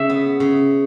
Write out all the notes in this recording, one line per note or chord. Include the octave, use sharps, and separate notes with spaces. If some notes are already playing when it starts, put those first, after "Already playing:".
Already playing: C#3 E5
B3
C#3